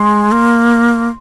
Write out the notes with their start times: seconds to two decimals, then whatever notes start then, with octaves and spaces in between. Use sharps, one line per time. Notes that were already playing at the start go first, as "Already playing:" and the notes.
Already playing: G#3 C6
0.32 A#3